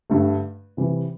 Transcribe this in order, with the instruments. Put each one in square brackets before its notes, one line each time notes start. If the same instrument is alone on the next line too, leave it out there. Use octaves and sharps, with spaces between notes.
[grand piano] G2 D3 A3
C3 E3 G3